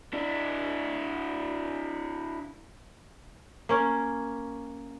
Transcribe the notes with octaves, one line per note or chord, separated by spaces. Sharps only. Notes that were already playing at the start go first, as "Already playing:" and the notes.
D4 E4
A#3 C#4